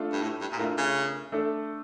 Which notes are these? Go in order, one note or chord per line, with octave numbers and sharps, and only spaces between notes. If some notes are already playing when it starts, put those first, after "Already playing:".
Already playing: A3 D4 F4 A4
G2
A2
G2
A#2
A2 A3 D4 F4 A#4
C#3
A3 D4 A4